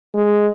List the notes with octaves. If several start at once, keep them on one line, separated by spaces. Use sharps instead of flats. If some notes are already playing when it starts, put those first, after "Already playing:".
G#3